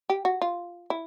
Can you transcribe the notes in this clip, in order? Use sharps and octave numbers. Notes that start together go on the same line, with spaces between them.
G4
F#4
F4
E4